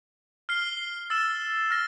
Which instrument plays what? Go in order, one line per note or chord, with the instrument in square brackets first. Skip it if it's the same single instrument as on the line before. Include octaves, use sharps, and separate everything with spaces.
[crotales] F6 C7 G7
E6 A6 E7
F6 A#6